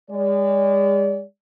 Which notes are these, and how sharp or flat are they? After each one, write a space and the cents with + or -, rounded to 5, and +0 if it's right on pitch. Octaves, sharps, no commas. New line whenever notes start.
G#3 -40 D5 -35